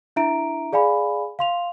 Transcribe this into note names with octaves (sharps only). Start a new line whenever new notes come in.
D4 E4 E5 A#5 D7
G#4 D5 F5 G#5 B5
F5 C6 F7